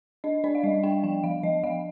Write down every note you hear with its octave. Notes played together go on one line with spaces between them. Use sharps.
D4 D#5
D4 D5
F5
G3 D#5
D4 G5
F3 G5
F3 F5
F3 D#5
F3 F5